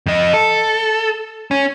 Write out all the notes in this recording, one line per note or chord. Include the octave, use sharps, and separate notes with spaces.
F2 D#5
A4
C#4